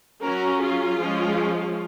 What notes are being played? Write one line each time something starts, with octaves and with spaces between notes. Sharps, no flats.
F#3 C#4 F#4 A#4
F4 G#4
F3 G#3 C#4